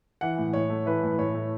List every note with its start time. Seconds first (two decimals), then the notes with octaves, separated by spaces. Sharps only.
0.21 E3 F#5
0.38 A2
0.53 A2 C#5
0.70 A3
0.86 E3 B4
1.03 A2
1.19 A2 C#5
1.35 A3